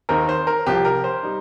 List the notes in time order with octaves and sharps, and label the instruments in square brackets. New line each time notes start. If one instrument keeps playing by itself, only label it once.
[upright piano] D#2 D#3 C4 D#4 A#4
C5
A#4
C2 C3 F3 G4
A#4
C5
G3 D#4